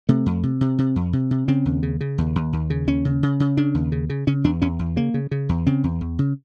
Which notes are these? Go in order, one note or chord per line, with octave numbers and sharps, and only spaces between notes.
C3 A3
F2
C3
C3
C3
F2
C3
C3
C#3 C4
D#2
C#3
C#3
D#2
D#2
D#2
C#3
D#2 C#4
C#3
C#3
C#3
C#3 D4
D#2
C#3
C#3
C#3 C#4
E2 D4
E2 C#4
E2
C#3 A#3
C#3
C#3
E2
C#3 C4
E2
E2
C#3